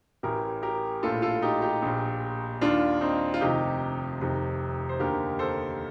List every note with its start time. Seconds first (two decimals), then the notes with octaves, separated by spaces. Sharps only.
0.23 A1 A2 G4 A#4
0.63 G4 A#4
1.03 A#1 A2 F4 A4
1.22 F4 A4
1.42 D#4 G4
1.62 D#4 G4
1.82 A#1 A#2
2.61 D#2 D#3 D4 F4
3.01 C4 D#4
3.34 F4
3.41 F1 F2 C3 D#3 D#4 G4
4.21 F1 F2 C3 D#3
4.89 C5
5.00 D#2 D3 G4 A#4
5.39 A4 C5